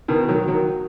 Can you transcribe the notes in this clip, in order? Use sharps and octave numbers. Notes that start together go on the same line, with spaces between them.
B2 D#3
D#3 F#3
D#3 F#3